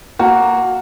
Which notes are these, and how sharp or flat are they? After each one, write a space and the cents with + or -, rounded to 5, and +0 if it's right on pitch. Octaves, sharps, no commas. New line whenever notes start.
A#3 +0 F#4 +0 A5 +40